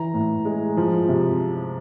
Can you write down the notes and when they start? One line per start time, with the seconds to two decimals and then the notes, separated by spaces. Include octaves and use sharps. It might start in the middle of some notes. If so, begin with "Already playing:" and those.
Already playing: E3 A#5
0.14 A2
0.45 G#3
0.77 F3
1.08 C3